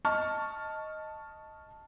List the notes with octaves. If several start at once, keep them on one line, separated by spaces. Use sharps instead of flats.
D#5 A5 C#6 F6